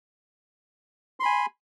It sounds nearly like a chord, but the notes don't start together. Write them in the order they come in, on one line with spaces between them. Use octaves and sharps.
C6 B5 G#5